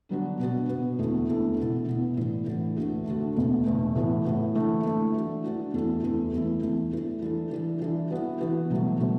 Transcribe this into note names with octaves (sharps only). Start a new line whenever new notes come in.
D3 F#3 B3 D4 F#4
B2 B3 F#4
B2 B3 F#4
E2 D3 A3 E4 A4
E2 D3 A3 E4 A4
B2 B3 E4
B2 B3 E4
A2 E3 B3 D4
A2 E3 B3 D4
D2 D3 A3 F#4 A4
D2 D3 A3 F#4 A4
E2 B2 A3
E2 B2 A3
A2 E3 B3
A2 E3 B3
D3 A3 E4
D3 A3 E4
E3 D4 F#4
E3 D4 F#4
E2 E3 A3 E4 A4
E2 E3 A3 E4 A4
E2 E3 A3 E4
E2 E3 A3 E4
E3 D4 A4
E3 D4 A4
E3 D4 A4
E3 D4 A4
E3 B3 F#4
E3 B3 F#4
B2 F#3 A3
B2 F#3 A3